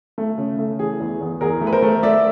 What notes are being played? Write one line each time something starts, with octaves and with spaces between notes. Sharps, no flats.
A3
C#3
A3
E3 G#4
E2
E2
E2 G#4 A#4
A3
B4
A#4 C5
A3
A3 D5 E5